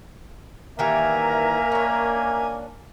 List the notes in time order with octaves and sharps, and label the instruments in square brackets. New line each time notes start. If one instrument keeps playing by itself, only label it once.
[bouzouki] D#3 E3 G3 [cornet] A#3 [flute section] A#4 E5 A#5 [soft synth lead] G#5
[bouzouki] C#4 D4